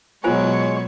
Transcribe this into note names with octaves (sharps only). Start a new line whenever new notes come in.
B2 F#3 G#3 F4 C5 C#5 G#5